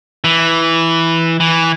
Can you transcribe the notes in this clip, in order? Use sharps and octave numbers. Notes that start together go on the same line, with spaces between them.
E3
E3